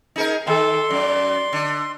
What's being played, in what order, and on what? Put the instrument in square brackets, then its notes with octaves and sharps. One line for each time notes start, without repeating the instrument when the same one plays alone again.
[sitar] D#4 G#4 A#4
[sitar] D#3 [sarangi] A4 [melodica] C6
[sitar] F#2 [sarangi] D5
[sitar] D3